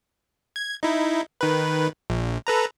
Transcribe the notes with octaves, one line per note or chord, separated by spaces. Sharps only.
G#6
D#4 E4
D#3 B4
A#1
A4 B4 A#5